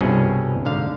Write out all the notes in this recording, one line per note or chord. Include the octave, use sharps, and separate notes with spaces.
C2 G2 B2 C#4 G#4
G#2 D3 F5